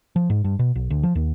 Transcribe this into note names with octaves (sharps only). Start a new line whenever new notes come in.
F3
G#2
G2
B2
B1
D2
F3
D#2